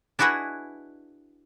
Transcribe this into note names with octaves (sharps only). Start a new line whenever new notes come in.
D4 E4 F#4 G#4 B4 D#5